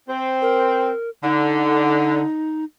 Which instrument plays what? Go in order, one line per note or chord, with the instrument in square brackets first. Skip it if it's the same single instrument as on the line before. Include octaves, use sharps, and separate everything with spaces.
[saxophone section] C4
[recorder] A#4
[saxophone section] D3 [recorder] D#4